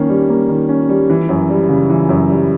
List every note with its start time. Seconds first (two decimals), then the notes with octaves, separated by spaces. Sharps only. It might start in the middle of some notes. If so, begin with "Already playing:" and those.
Already playing: D#3 A#3 C#4
0.09 G3
0.29 A#3
0.49 D#3
0.69 C#4
0.89 G3
1.10 E3
1.29 F#2
1.49 G3
1.69 C#3
1.90 E3
2.09 F#2
2.29 G3